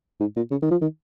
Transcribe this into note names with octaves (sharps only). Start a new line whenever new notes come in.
G#2
A#2
C#3
D#3
F3
D#3